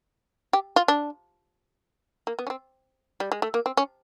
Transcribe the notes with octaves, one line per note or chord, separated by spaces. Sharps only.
G4
F4
D4
A#3
B3
C#4
C4
G3
G#3
A3
A#3
C4
C#4